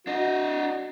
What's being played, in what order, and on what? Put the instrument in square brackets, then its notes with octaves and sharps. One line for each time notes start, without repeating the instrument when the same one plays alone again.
[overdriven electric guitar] D4 D#5 [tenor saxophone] F#4